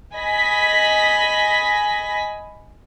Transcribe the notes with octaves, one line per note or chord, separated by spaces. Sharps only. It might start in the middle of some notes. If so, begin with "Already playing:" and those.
D#5 G#5 B5 A#6 B6